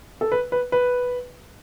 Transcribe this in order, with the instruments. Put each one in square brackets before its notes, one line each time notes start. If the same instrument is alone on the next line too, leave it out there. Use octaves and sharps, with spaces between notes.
[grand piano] A4
B4
B4
B4